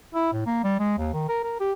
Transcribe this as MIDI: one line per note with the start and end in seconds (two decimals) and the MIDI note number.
0.15 0.32 64
0.32 0.42 45
0.46 0.62 58
0.64 0.76 55
0.79 0.97 56
0.98 1.09 39
1.14 1.25 51
1.29 1.41 70
1.44 1.60 70
1.60 1.72 67